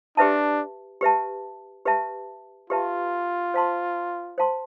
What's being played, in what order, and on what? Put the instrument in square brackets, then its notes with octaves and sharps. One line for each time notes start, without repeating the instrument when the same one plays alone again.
[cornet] D4 [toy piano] G4 B4 E5 A5
[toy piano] G4 B4 E5 A5
G4 B4 E5 A5
[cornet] F4 [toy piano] G4 B4 E5 A5
[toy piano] C5 F5 A5 C6
C5 F5 A5 C6